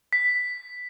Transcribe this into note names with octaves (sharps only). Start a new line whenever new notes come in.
B6